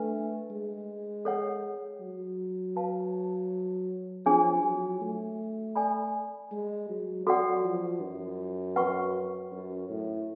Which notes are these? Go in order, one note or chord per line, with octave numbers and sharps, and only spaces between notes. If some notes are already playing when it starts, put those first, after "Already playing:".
Already playing: A3 D4 B4
G#3
A4 C#5 F#5
F#3
B4 F5 A5
F3 D4 G#4 C#5 G#5
F#3
A3
A4 D5 G#5 B5
G#3
F#3
F#3 F#4 A4 D5 F#5 C#6
F3
F#2
F#4 B4 F#5 C#6
F#2
A2